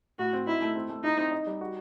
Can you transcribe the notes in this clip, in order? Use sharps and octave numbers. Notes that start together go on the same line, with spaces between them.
A2 F#4
C4
D#4 E4
A3
C4
A3
D#4 E4
C4
D#4
G3
F#4